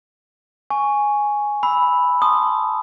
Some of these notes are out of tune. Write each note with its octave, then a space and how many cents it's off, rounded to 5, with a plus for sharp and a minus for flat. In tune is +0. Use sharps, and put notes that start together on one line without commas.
G#5 +0 C#6 +5
B5 +0 E6 -10
A5 +0 C6 +10 D#6 -15